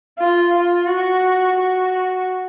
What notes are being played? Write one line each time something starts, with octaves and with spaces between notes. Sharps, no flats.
F4
F4
F#4
F#4